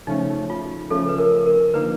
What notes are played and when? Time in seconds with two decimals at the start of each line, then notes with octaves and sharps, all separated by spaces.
0.07 C#3 F3 A3 C#4 D#4
0.50 F4
0.90 C#3 F3 A3 C#4 A4
1.09 B4
1.18 A#4
1.46 A#4
1.73 D3 F3 A#3 D#4 B4